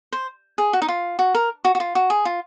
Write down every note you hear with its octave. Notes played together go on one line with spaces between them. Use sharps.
C5
G#4
F#4
D#4
F4
F#4
A#4
F#4
F#4
F4
F#4
G#4
F4